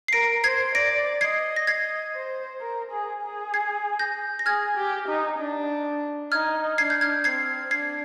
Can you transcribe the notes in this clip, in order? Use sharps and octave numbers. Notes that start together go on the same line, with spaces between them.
C7
A#4 A#6 D7
C5 G#6 C7
D5 A#6 D7
D#5 G#6 C7
A#6
D#5 G#6 C7
C5
A#4
G#4
G#4
G#6 C7
G6 A#6
A#6
G#4 F6 G#6
G4
D#4
D4
D#4 F6 G#6
D4 G#6 C7
G6
F6 G#6
C4 G#6 C7
D4 G#6 C7